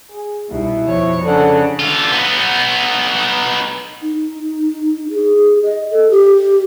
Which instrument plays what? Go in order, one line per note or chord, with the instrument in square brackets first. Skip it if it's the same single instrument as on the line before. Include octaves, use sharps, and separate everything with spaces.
[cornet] G#4
[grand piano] C2 D#4 [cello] B2 [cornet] E4
[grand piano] F2 [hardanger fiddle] C#5
[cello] C#3 [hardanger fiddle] D4 F#5 [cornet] A4
[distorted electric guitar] D3 F4
B3 D#4
[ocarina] D#4
G#4
D#5
A4
G4